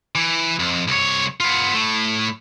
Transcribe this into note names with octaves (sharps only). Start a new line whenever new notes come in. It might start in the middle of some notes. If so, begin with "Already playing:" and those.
E3
F2
C2 C#5
B3 F4
A2 A3